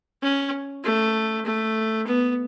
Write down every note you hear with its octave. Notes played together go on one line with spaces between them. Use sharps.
C#4
A3
A3
B3